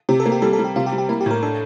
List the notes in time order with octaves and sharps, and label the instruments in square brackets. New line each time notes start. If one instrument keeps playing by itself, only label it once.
[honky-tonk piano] C3 [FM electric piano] G4
[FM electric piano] A4
[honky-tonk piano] A#3
[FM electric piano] G4
[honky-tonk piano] G3 [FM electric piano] A4
[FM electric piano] A4
[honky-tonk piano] G3
[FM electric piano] G4
[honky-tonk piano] C3 [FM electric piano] F4
[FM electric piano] G4
[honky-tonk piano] G3
[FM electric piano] G4
[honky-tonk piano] A#3 [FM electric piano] E4
[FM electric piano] G4
[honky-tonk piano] A2 [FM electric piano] A#4
[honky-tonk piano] D4 [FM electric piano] A4